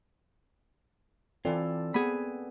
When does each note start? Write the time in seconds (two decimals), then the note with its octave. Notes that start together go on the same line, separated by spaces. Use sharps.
1.45 E3 C4 F4 A4 D5
1.94 B3 G#4 B5